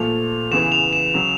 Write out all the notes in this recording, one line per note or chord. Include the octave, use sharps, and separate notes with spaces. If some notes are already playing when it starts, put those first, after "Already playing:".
Already playing: A#2 F3 A3 F7
E2 C#3 E3 E7
F7
E7
C#3 F#3